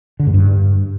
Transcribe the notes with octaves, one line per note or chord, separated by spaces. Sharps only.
D3
G#2
G2